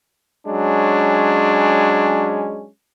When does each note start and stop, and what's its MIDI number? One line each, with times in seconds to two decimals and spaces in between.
0.48 2.68 54
0.48 2.68 56
0.48 2.68 61
0.48 2.68 62